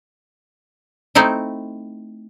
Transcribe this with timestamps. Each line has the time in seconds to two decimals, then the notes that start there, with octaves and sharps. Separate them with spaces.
1.15 A3 C4 D#4 E4